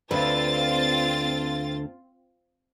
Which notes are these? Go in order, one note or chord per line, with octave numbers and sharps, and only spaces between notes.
D2 D3 C4 F4 B4 A6